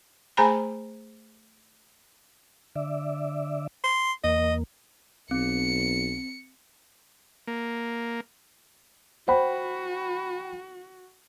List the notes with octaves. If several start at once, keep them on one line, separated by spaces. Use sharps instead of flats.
A3 G#4 C5 G#5 A#5 B5
D3 D5 E5
C6
E2 A#3 D#5
B1 C4 C#7
A#3
F#4 C5 F#5 G5 B5